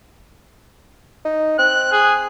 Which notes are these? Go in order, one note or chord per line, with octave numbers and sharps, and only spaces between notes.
D#4
C4 F#6
G#4